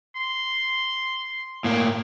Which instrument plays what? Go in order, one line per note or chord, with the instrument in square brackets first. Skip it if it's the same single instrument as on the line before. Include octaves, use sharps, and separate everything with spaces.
[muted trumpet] C6
[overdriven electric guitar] A2 A#3